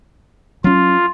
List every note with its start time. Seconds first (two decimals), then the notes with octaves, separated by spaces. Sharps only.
0.64 F#3 C#4 F4